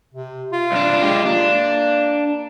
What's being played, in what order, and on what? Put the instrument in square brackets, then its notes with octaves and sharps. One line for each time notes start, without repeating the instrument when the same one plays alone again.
[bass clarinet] C3
F4
[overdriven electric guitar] C2 D4
G#3 G4
[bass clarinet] A#3 [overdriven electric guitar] D4